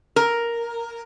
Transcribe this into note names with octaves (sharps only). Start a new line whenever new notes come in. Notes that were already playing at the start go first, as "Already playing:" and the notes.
A#4